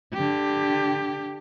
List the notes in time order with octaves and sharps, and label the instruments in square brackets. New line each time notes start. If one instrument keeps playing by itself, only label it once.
[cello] D3 G4